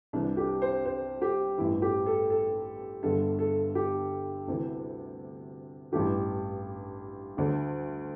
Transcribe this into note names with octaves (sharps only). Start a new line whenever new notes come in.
C2 C3 E3 D4
G4
C5
C5
G4
A1 G2 E3 E4
G4
A4
A4
G1 G2 D3 A4
A4
G4
D2 C3 E3
A1 G2 E3 G4
D2 D3